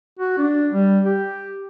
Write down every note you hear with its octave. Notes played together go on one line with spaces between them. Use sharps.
F#4
D4
G3
G4